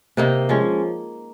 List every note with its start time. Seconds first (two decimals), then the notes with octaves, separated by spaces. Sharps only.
0.17 C3 D#3 A#3 D#4
0.49 F3 G#3 C#4